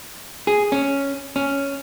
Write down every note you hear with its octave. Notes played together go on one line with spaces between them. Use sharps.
G#4
C#4
C#4